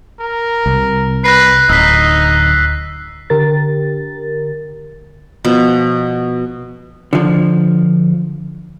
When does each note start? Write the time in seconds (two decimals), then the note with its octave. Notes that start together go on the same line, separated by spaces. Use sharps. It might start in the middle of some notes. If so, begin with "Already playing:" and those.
0.20 A#4
0.66 C2
1.24 B4 F#6 A#6 C7
1.69 D1 D#4 E6 B6
3.30 D3 G4 A#4 A6
5.45 B2 F3
7.13 D3 F3